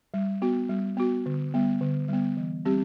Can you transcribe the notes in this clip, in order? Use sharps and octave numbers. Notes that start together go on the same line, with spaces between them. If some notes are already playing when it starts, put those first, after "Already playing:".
G3
B3 F#4
G3
B3 F#4
D3
G3 B3
D3
G3 B3
E3
G3 C4 G4